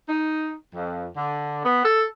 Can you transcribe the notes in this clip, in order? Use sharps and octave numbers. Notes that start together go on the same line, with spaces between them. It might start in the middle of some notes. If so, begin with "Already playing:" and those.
D#4
F2
D3
B3
A4